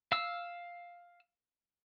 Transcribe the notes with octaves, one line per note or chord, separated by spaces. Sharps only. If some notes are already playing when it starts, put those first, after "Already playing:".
F5 E6